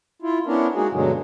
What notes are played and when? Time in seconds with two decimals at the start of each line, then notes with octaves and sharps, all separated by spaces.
0.22 E4 F4
0.46 B3 C#4 D4 E4 A#4
0.75 G#3 A#3 D#4 F#4 G#4
0.92 G2 B2 D3 F#3 G#3